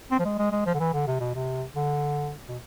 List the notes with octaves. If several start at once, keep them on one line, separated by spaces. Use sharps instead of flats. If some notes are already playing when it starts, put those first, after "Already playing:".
C4
F3
G#3
G#3
G#3
F3
D3
E3
D3
C3
B2
C3
D3
B2